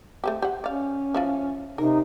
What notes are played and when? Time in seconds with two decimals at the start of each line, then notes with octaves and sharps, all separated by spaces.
0.24 A3 C4 G4
0.42 G4 C5 F#5
0.64 C#4 D5 F5
1.14 F3 E4 F4
1.78 C3 D#4 A#4